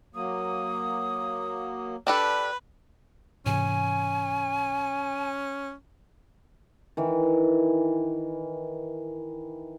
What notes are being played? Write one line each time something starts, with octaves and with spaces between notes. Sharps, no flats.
F#3 A#3 D#6
D4 G4 A4 B4
G#2 C3 E3 C#4 G#5
D#3 E3